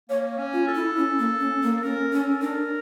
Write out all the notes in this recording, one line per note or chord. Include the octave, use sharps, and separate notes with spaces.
A#3 C#5
C#4
F4
A4
E4
C#4
A#3
C#4
A#3
A4
C#4 A#4
C#4 A4
D4 A#4